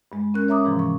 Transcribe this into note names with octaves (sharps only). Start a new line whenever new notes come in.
G2 G#3
C#4 A#4 F#6
C#5 E5 A#5 D6 D#6
G#2 C3 E3 F3
C#6